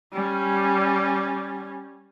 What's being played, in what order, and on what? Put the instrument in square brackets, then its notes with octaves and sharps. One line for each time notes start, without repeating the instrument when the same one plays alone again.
[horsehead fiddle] G3 C#4